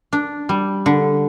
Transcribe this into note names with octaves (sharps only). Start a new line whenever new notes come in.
D4
G3
D3